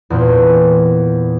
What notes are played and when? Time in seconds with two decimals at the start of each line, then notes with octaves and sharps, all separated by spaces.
0.10 E2 A#2 C4